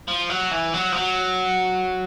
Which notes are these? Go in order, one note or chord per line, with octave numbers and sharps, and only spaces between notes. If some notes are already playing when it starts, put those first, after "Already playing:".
F3
F#3
E3
F#3
F3
F#3